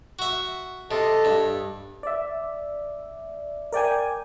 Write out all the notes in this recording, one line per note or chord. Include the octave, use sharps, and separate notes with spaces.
F#4 E5
C3 A4 D#5 A5
G2
D5 E5
A#4 D5 G5 G#5